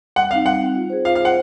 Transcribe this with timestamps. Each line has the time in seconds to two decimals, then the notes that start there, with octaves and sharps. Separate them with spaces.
0.16 G3 F#5
0.31 C4 D#4 F5
0.45 G3 F#5
0.61 C4 D#4
0.75 F4
0.90 G#4 C5
1.05 F4 F5
1.16 F5
1.20 G#4 C5 F#5